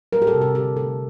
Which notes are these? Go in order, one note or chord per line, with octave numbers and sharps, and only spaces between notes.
G3 A#4
G4
A4
C3
G4
D3 G4
A3 A4